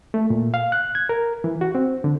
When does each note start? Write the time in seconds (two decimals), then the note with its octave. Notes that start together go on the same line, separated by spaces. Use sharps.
0.14 A3
0.30 A#2
0.54 F5
0.72 F#6
0.95 G#6
1.09 A#4
1.44 E3
1.61 F#4
1.75 C4
2.04 D3